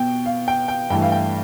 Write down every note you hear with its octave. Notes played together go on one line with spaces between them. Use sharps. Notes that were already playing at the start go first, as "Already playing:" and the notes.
Already playing: B2 B3 G5
F5
G5
G5
G2 E3 A3 G5
F5
G5